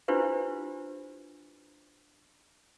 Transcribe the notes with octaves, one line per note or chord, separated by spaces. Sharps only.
D4 E4 F4 G4 B4 C5